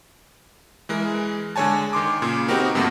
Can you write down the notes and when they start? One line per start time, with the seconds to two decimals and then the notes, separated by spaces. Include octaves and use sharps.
0.89 E3 G#3 A#4
1.56 D3 G#3 C#5 G#5 A5
1.93 D#3 C6 D6
2.22 A#2 C#3
2.48 B3 C4 D#4 F#4 G4 A#4
2.75 G2 C3 F3 A3 A#3 F#4